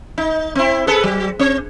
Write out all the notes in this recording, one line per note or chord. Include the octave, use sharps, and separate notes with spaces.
D#4
C4 E4
G#4 A4 B4
F#3
C4